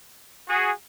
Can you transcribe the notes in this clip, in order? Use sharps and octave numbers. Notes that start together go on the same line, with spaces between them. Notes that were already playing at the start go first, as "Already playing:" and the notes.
F#4 G#4